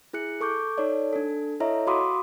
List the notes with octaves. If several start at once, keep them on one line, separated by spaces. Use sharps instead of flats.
E4 G#4 F#6 C#7
A4 C#6 D6 G6
D#4 A4 C#5 D5
D4 A4
E4 A4 C#5 D#5 E5 A#5
F#4 F5 B5 C6 D6 D#6